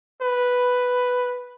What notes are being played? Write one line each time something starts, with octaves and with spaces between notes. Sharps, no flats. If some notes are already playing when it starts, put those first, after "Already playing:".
B4